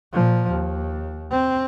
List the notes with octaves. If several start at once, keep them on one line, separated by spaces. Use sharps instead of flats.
A#2 F3
D#2
C4